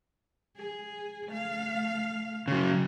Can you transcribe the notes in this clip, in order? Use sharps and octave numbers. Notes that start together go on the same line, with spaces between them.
G#4
A3 F5
C#3 F#3